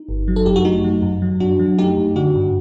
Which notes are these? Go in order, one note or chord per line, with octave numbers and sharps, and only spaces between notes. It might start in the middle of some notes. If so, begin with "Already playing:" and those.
Already playing: D#4
G1
F#3
A4
F#2 G4
F#4
A3 D#4
F#3
F#2
F#3
F#2 D4 F#4
F#3
A3 D#4 G4
F#2
D3 D4 F#4
G2